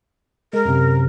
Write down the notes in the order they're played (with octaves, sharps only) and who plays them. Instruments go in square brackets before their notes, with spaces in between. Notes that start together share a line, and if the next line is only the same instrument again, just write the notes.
[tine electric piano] G#3 [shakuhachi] A#4
[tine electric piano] F#2 C3